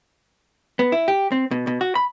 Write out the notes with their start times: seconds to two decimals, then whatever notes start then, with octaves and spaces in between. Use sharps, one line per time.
0.79 B3
0.92 E4
1.08 G4
1.32 C4
1.51 B2
1.67 B2
1.81 F#4
1.95 B5